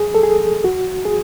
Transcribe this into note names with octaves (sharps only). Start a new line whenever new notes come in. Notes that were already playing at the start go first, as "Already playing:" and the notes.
Already playing: G#4
A4
G#4
F#4
G#4